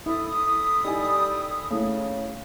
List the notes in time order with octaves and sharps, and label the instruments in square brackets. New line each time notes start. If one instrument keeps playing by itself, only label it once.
[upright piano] E4 [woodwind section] A4 B5 D#6
[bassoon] G3 [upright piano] D#4 E4 G#5
[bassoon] C#3 [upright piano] A3 E4